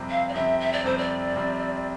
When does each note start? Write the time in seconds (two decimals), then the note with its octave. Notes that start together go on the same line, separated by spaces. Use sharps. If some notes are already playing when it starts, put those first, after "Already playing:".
Already playing: F2 C3 G3 C4
0.10 F5
0.28 D5
0.34 F2 C3 G3 C4 E5
0.60 E5
0.72 D5
0.84 F2 C3 G3 C4 C5
0.97 D5
1.33 F2 C3 G3 C4